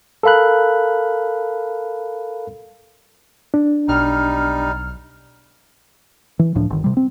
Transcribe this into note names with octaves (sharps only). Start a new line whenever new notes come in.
A4 A#4 F5 B5 F#6
D4
B1 G3 D#4 F6
E3
C#2 A2 F3 D4
G1 D#3
C3 G3
C4